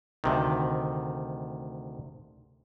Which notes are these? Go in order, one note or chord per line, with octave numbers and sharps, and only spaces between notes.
D2 C3 D#3